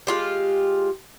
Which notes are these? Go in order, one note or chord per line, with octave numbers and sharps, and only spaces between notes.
G#3 F4 G4